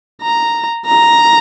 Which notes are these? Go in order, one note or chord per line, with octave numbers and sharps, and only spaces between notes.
A#5
A#5